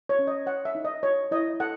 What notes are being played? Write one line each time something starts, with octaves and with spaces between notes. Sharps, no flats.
C#5
C#4
D#5
C#5 F#5
E5
D#4
D#5
C#5
E4 D#5
A4 F#5